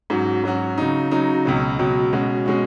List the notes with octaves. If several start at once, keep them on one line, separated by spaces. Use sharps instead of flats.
G#2 F#3 C#4 F#4
G#2 F#3 C#4 F#4
C#3 F#3 D#4
C#3 F#3 D#4
C#2 B2 F#3
C#2 B2 F#3
B2 G#3 C#4 F#4
B2 G#3 C#4 F#4